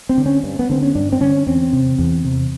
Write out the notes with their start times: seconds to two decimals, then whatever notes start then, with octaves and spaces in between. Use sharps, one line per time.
0.09 C4
0.18 D3
0.26 C#4
0.43 G2
0.59 B3
0.69 D3 C4
0.83 C#4
0.95 G2 D4
1.12 C4
1.21 D3 C#4
1.46 E2 C4
1.73 C3
1.98 E2
2.25 C3